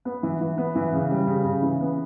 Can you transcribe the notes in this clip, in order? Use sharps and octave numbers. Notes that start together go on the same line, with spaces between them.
B3
E3
E3
B3
E3
C#3
G3
C#3
C#3
E3
B3